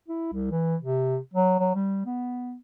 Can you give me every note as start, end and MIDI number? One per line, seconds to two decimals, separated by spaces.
0.08 0.29 64
0.32 0.48 36
0.51 0.76 52
0.82 1.18 48
1.34 1.56 54
1.59 1.73 54
1.75 2.03 55
2.06 2.56 59